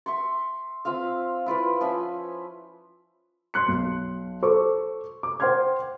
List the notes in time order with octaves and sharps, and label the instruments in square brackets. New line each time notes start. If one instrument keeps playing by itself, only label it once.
[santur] E5 C6 C#6
C4 F4 E5 F5
E4 F4 B4 D5
F3 C#4 E5 G#5
[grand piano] C6 F#6 C#7
B1
A4 C5 C#6 D6
D6
C5 F#5 G5 C6 F6 G#6